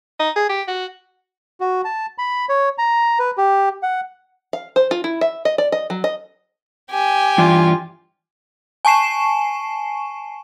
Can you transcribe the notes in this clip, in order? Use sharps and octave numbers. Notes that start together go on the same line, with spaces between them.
D#4
G#4
G4
F#4
F#4
A5
B5
C#5
A#5
B4
G4
F#5
F5
C5
F4
E4
E5
D#5
D5
D#5
F#3
D#5
G4 G#5
G2 E3 F4 D5
G#5 A5 C#6 C7 E7